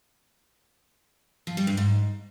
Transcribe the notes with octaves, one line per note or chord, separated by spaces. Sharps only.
F3
G3
G2
G#2